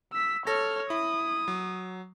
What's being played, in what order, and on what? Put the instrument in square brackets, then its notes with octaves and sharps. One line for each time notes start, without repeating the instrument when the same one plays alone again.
[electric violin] E6 B6
[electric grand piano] A4 A#6 [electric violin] C#5 F6
[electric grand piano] E4 [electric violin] D#6
[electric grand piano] F#3